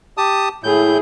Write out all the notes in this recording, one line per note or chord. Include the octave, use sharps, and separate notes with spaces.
G4 A5 D#6
A2 E4 G#4 G6